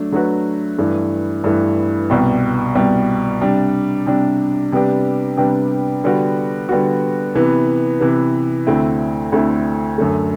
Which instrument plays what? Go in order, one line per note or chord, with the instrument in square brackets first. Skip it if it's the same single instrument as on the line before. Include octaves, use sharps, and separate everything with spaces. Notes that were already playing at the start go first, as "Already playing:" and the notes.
Already playing: [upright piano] F#3 A3 D4
F#3 A3 D4 F#4 B4
G2 E3 A3
G2 E3 A3
C2 B2 G3
C2 B2 G3
C3 G3 D4
C3 G3 D4
C3 G3 B3 D4 G4
C3 G3 B3 D4 G4
D3 G3 B3 F#4
D3 G3 B3 F#4
C3 E3 B3
C3 E3 B3
D2 D3 A3 C4 E4
D2 D3 A3 C4 E4
F#2 D3 A3